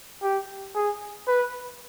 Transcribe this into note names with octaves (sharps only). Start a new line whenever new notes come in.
G4
G#4
B4